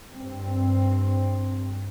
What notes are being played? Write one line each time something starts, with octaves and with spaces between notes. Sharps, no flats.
G2 C4